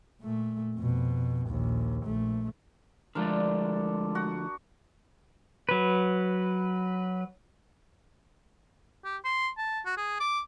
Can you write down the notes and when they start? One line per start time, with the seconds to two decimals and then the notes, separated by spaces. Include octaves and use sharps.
0.21 A#2 A3
0.76 F2 B2
1.48 A#1 D#2
2.05 A#1 A3
3.15 D3 F3 G#3 A3 D4 A#4
4.15 F#4
5.69 F#3 B4
9.05 G4
9.25 C6
9.58 A5
9.86 F#4
9.98 G#4
10.20 D6